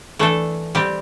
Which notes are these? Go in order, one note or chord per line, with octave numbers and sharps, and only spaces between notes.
E3 A3 D4 A4
G3 C4 G4